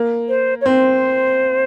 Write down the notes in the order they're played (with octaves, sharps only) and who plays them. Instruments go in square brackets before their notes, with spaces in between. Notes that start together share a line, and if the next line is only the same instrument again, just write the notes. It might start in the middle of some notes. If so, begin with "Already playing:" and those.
Already playing: [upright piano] A#3
[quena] C5
C#5
[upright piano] C4 [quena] C5